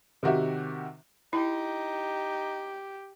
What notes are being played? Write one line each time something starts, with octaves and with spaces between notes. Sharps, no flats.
C3 D#3 F#4 G4 E5
D#4 E4 G4